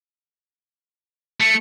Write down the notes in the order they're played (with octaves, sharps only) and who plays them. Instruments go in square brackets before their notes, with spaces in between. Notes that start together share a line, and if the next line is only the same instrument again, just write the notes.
[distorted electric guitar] A3 [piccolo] C#7